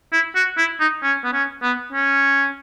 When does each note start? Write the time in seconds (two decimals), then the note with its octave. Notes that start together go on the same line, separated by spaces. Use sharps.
0.13 E4
0.36 F#4
0.58 E4
0.80 D#4
1.03 C#4
1.24 B3
1.33 C#4
1.63 B3
1.92 C#4